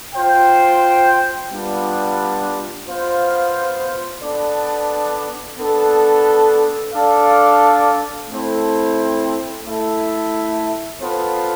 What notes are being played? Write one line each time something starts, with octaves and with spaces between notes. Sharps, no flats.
F4 C5 G5
G3 B3 D4 F4
B3 F4 C5 F5
B3 D4 A4 D5
B3 D4 A4
D4 A4 D5 F5
A3 C4 E4 A4 C5
A3 E4 A4 E5
B3 F4 A4 C5